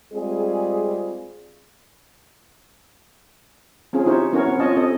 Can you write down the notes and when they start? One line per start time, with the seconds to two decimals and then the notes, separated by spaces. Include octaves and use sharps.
0.14 G3 G#3 C4 F4 G#4
3.93 C4 C#4 F4 G#4
4.06 D#4 E4 G4 C5 C#5
4.33 B3 C#4 E4 F#4 A#4 C#5
4.48 C4
4.59 C#4 F4 C#5 D#5 A5
4.77 C4 A4 D#5